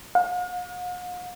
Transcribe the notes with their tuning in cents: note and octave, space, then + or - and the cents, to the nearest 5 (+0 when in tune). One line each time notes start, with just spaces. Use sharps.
F5 +45